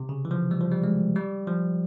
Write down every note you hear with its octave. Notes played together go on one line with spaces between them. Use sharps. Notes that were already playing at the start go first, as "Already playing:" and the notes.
Already playing: C3
C#3
E3
F3
G3
F3
G3
G#3
G3
F3